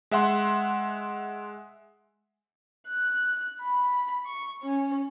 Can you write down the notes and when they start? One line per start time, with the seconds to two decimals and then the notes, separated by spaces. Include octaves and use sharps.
0.11 G#3 E5 F#5 C6
2.88 F#6
3.61 B5
4.26 C#6
4.62 C#4